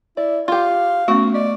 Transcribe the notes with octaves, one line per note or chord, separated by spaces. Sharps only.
E4 D5
F4 G4 F5
A3 B3 C#4 F#4
D5 D#5